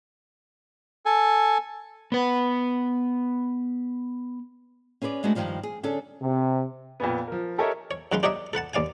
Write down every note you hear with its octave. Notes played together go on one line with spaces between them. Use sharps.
A4 G#5
B3 B4
C#4 G#4 B4 C5 D5
G#3 A3 B3 D4 F#4 G#4
G2 B2 D#3 F3 G3
G#4
D3 C#4 D4 G#4 A4
C3
F2 A#2 B3
F3 A#4
G4 A4 A#4 C#5 D#5 E5
C#5
F#2 D#3 G#3 B4 F5 C6
D4 G4 A#4 C#5 D#5 E5
A4 B4 F#5 A5
D#2 D5 F5 G#5